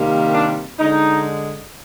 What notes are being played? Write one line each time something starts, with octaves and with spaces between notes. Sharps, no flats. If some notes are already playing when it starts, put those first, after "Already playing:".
Already playing: C3 D#3 G3 A#3
D4
D3 G#3 D#4